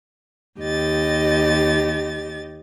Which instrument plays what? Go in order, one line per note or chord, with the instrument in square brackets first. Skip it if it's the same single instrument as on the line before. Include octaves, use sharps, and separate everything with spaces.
[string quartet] D#2 G4 D#5 A6